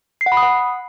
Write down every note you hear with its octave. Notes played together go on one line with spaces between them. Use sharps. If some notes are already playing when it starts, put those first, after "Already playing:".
C7
F#5
B5
D#6
F#5